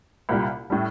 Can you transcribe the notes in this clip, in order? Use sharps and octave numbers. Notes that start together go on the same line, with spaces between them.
C2 A#2 G3
A2 G3